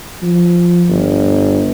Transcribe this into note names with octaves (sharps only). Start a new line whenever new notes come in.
F3
G1